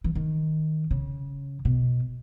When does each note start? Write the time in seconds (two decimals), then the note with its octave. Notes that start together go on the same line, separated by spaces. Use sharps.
0.04 E3
0.15 D#3
0.91 C#3
1.65 B2